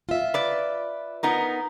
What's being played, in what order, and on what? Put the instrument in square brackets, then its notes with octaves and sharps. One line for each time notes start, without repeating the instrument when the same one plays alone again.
[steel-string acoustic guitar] F4 E5
[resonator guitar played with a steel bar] B4 D5
B3 D#4 A#4